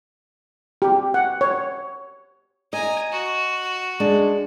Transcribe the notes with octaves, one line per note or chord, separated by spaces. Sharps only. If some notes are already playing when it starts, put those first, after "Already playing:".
G4
F#5
C#5
D#5 G#5 A#5
F#4
G#3 D4